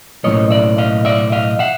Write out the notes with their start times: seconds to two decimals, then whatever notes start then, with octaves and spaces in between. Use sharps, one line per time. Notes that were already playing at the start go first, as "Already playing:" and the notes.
0.23 B1 A2 F3 A#3 C#4 C#5 D#5
0.51 D5 E5
0.78 D#5 F5
1.05 D5 E5
1.32 D#5 F5
1.59 E5 F#5